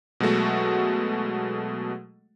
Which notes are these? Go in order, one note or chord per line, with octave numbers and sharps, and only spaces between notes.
B2 F#3 G#3 A3 F#4